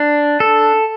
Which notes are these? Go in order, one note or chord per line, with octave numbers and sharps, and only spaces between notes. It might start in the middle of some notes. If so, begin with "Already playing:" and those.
Already playing: D4
A4